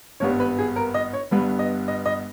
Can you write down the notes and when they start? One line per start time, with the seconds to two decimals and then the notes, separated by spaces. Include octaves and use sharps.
0.20 G#1 G2 G3 B3 C#5
0.40 B4
0.58 G#4
0.76 A#4
0.94 D#5
1.13 C#5
1.31 G1 G2 G3 B3 B4
1.59 D#5
1.88 D#5
2.06 D#5